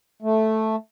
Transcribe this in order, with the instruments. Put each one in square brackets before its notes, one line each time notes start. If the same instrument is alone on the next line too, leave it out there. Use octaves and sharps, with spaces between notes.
[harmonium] A3